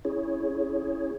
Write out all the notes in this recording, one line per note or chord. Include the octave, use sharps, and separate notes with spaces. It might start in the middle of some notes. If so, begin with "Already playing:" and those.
C#4 E4 G#4 C#5